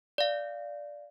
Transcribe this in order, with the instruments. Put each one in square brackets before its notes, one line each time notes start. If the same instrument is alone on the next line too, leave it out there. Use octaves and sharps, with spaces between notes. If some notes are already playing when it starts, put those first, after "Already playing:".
[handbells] D5 F5